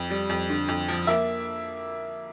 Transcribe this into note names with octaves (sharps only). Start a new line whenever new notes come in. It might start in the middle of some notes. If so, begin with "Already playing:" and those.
Already playing: F2
G3
F2
D3
F2
F3
A#3 E5